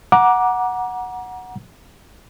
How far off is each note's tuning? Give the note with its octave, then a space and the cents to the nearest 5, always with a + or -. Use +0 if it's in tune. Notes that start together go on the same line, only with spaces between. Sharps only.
F#5 -5 A#5 +30 D6 +0